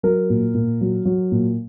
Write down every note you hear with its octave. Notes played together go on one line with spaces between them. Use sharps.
F#3 A#4
A#2
A#2
F#3
F#3
A#2